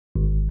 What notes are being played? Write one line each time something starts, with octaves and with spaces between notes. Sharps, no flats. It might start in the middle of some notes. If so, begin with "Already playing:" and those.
G#1